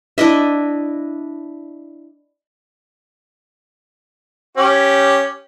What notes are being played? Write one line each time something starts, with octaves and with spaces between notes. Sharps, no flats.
D4 E4 D#5 E5
C#4 G4